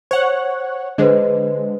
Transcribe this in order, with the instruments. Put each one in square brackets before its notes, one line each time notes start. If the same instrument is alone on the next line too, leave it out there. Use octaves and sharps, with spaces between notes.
[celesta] C5 [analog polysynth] C#5 F#5
[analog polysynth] D3 G#3 [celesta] B4 C5 D#5